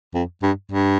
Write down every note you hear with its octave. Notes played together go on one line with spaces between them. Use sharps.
F2
G2
G2